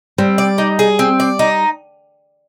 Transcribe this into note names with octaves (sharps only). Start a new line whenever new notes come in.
G3 C4
D5
D#4
G#4
C4
D5
D#4